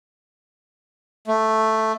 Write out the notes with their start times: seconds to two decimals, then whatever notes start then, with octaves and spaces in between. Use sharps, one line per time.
1.27 A3